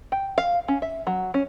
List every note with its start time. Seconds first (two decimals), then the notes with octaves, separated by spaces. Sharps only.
0.12 G5
0.38 F5
0.68 C#4
0.82 E5
1.07 F#3
1.34 C#4